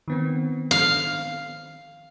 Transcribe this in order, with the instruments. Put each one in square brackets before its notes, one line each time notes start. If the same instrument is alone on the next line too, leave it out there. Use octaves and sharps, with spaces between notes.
[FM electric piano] D#3 B3 C4
[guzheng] F5